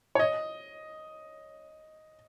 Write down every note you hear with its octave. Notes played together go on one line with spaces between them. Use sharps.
C#5
D#5